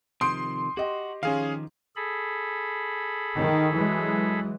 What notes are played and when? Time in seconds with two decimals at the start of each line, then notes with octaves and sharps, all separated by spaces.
0.21 C3 D#3 F3 C6 D#6 G6 D7
0.77 F#4 G4 D#5
1.23 D#3 F3 C#4 G#4 F5
1.96 G#4 A4 B5
3.36 D#3
3.74 E3 F#3 G#3